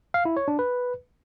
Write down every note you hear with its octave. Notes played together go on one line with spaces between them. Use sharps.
F5
E4
C#5
D4
B4